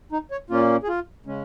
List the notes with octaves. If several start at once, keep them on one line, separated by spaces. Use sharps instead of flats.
D#4
C#5
A#2 A#3 C#4 F4
G#4
F4
C#3 G#3 C#4